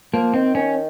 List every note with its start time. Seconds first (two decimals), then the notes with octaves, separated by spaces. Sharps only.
0.13 F3 A#3
0.34 D#3 C4
0.55 D#3 C#4